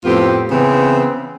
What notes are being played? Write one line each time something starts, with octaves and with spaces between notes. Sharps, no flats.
F2 A2 B3 C4 F4 G4
C#3 E3 B3 C4